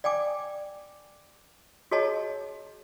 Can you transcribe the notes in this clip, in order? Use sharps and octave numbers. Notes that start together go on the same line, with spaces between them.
D5 G5 G#5 D6
F#4 G#4 C#5 D#5 A5 A#5